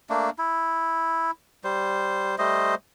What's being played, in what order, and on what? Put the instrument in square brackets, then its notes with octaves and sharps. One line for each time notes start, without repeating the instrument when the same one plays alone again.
[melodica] A3 A#3 D4
E4
G3 C5
G3 A3 C5 D#5